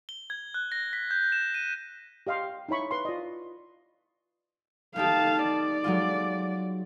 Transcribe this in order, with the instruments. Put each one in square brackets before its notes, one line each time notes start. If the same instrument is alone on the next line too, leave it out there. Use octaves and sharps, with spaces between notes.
[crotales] G7
G#6
F#6
A#6
B6
G6
E7
D#7
[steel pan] G4 D#5 F5 G5 C6
D#4 E4 C#5 B5 C#6
B4 C6
F4 D5 D#5
[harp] A3 D#4 G4 [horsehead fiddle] F5 A5
[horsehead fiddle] D5
[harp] F#3 G#3 F4